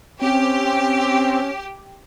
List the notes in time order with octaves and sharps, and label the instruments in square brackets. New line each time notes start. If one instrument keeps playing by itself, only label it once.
[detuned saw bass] C4 [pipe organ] C#4 [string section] G4